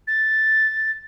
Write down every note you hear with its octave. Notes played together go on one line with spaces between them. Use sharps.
A6